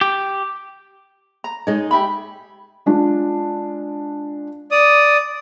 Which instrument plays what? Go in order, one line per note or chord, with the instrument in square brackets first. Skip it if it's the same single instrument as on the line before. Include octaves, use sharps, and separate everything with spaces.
[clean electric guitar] G4
[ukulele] A#5
[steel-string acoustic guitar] G#3 D#4 [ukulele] C#5 D#5
[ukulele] G4 E5 B5
[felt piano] G#3 D4 F4
[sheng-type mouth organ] D5 D#6